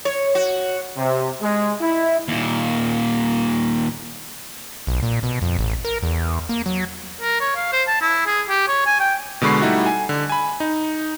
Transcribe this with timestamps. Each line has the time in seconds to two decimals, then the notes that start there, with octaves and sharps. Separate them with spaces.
0.05 C#5
0.35 F#4
0.97 C3
1.41 G#3
1.81 E4
2.28 D#2 A#2
4.87 B1
5.03 A#2
5.23 B2
5.42 F2
5.59 A1
5.85 A#4
6.03 E2
6.49 A#3
6.66 F#3
7.21 A#4
7.41 C#5
7.55 F5
7.72 C5
7.88 A5
8.01 E4
8.26 G#4
8.49 G4
8.68 C#5
8.86 G#5
9.00 G5
9.41 B2 D3 G#3 B5 C#6 C7
9.62 G3 A3 D#4 E4 F#4
9.86 G#5
10.09 D3
10.30 G#5 B5
10.60 D#4